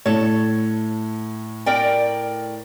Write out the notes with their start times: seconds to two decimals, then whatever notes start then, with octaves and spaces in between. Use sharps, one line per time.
0.06 A2 A4 C#5 A5
1.66 A#4 D5 G5